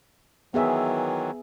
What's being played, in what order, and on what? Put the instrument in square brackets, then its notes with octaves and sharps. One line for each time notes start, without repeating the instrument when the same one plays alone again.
[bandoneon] D#3 E3 F#3 [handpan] B3 G#4 E5